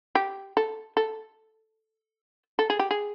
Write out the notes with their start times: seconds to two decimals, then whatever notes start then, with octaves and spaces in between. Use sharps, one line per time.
0.15 G4
0.57 A4
0.97 A4
2.59 A4
2.70 G#4
2.79 G4
2.91 G#4